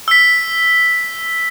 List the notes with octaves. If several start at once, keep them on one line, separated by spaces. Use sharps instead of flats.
E6 B6